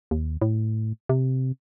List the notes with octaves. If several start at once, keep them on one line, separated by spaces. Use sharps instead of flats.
D#2
A2
C3